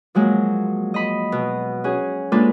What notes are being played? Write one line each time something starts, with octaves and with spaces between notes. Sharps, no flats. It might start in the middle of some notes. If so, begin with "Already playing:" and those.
F3 F#3 G#3 A#3
D#5 B5
B2
C#4 F#4 G#4
G#3 A#3 D4 F4 A4 B4